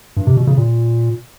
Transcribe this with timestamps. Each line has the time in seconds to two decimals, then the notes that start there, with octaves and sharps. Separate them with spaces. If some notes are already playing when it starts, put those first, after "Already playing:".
0.17 G2
0.27 C3
0.37 B2
0.47 C#3
0.57 A#2